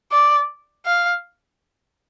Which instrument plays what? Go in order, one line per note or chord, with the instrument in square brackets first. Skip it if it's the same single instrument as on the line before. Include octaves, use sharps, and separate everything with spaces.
[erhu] D5
F5